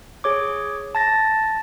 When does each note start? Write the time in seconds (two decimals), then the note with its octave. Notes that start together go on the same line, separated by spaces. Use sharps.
0.24 G#4 C#5 D6
0.95 A5 A6 A#6